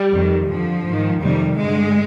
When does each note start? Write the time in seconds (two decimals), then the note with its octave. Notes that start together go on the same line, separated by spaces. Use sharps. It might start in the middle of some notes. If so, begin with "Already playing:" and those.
Already playing: G3
0.12 F2 D#3
0.48 F2 D3 F3
0.85 G#2 D#3
1.20 F2 C3 D#3 G3
1.56 G2 D3 G#3